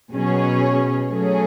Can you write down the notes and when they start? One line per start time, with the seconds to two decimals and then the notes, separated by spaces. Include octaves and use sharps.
0.13 B2 F#3 C#4 G#4 C#5
1.10 F#3 A3 C#4 G#4